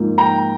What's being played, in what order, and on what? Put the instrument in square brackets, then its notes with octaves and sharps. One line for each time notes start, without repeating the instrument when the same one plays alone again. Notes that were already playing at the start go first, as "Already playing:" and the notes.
Already playing: [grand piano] G#2 F3 A#3
G5 A#5